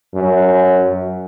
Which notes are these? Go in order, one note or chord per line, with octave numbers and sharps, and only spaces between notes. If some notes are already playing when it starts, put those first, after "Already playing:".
F#2